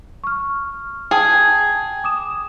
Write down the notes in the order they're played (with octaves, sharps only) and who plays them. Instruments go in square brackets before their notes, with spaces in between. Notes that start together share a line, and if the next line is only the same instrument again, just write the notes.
[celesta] C#6 F6
[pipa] G#4 [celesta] G5 A5
[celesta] D6 D#6 E7